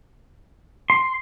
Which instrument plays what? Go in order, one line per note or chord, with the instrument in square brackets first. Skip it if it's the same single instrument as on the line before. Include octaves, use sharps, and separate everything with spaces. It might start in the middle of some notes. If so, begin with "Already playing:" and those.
[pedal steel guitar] C6